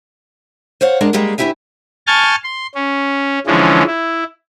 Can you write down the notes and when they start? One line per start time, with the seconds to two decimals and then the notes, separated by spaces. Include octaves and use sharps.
0.81 C5 C#5 F5 F#5
1.01 G#3 D4 A#4 D#5 A5
1.13 G3 G#3 A#3 G4 G#4
1.38 D2 F3 E4 G4 E5 G#5
2.07 G#5 A5 C#6 F6 G6 A6
2.44 C6
2.75 C#4
3.47 D3 E3 F3 G#3 C#4
3.87 E4